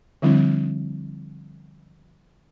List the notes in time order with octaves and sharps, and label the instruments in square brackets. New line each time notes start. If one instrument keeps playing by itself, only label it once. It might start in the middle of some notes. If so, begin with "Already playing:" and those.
[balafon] D3 F3 G3 C4 D4 E4